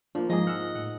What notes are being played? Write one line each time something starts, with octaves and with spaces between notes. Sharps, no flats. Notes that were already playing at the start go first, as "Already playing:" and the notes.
F3 A#3 D4
G#2 F3 G#3 G#4 D#5
F#5 E6 F6
A2 F#5